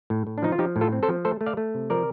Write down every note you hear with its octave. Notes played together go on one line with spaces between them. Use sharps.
A2
A2
D4
F3 D#4
F4
F3 D#4 G4
A2
F4 A4
C4
A4 C5
F3
A3 A4 C5
A3
D5 F5
A3
C3
F3 A#4 D5